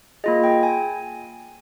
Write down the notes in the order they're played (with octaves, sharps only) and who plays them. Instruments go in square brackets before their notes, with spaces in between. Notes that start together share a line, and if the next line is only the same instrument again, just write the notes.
[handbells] A#3 F4 G#4 D#5
G5
G#5